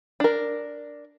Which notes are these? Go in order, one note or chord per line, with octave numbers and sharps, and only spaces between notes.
D4 A#4